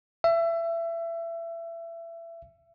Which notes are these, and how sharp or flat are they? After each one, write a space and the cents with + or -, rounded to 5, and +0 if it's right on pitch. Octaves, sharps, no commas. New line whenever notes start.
E5 +25